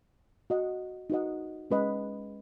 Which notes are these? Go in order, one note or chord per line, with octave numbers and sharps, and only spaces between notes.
F#4 D#5 F#5
D#4 F#4 B4 D#5 F#5
G#3 C#4 B4 D#5 F#5